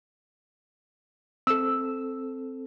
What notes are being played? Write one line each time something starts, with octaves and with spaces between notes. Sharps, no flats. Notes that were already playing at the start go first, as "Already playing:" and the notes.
C4 A4 E6